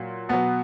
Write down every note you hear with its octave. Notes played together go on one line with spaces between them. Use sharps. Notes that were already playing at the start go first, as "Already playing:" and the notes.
Already playing: A#2 F#3
B2 F#3 B3